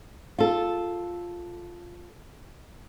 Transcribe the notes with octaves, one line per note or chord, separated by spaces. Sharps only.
F4 A4